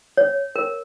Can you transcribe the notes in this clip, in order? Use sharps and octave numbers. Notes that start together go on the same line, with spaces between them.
C#5
A#4